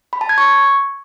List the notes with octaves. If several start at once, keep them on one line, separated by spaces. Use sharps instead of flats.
B5
A5
G#6
C#6